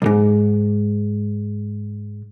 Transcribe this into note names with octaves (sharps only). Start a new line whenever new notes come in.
B1 G#2